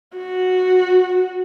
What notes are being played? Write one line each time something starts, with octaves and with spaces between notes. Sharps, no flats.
F#4